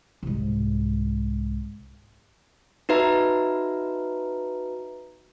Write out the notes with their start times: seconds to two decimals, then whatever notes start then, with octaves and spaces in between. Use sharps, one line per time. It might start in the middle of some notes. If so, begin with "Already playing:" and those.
0.23 C2 G#2
2.89 D#4 F#4 B4 E5 A#5